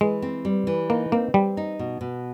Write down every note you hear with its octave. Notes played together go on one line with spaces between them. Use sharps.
E3 G#3
C4
G3
E3
A#3 D#4
A#3 C4
G3 C4
D#4
B2
B2